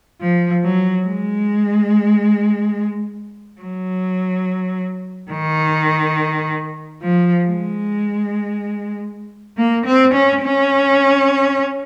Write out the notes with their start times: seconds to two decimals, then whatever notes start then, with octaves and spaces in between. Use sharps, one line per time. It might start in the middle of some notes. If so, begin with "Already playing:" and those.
0.21 F3
0.63 F#3
1.06 G#3
3.61 F#3
5.32 D#3
7.02 F3
7.45 G#3
9.58 A#3
9.85 C4
10.14 C#4
10.42 C#4